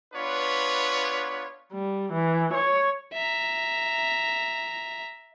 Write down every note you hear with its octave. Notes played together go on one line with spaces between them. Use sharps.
B3 D4 F4 B4 C#5
G3
E3
C#5
E5 A#5